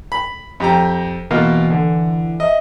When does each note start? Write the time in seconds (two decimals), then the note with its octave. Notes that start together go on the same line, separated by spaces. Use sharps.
0.12 B5
0.60 F2 G4 A#5
1.31 B2 E3 A#3 F4
1.70 D3
2.40 D#5 E5